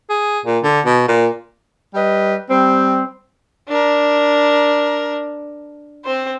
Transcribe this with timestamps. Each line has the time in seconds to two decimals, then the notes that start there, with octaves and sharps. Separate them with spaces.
0.10 G#4
0.46 A#2
0.63 D3
0.86 B2
1.08 A#2
1.95 G3 B4 D#5
2.49 G3 C4
3.68 D4 A#4
6.04 C4 C5